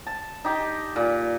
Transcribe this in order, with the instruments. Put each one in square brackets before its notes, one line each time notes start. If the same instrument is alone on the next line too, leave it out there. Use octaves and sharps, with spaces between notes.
[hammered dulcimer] A5
D#4 G4
A#2